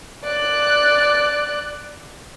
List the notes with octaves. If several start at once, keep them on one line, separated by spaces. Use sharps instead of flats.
D5 F#6